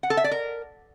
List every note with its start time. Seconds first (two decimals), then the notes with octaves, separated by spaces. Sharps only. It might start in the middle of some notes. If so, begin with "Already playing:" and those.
0.03 F#5
0.10 A4
0.17 E5
0.24 D5
0.31 A#4